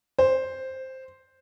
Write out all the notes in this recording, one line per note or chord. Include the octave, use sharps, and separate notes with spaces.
C5